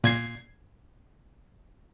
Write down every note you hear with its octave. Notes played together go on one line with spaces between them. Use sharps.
A#2 G#6 C7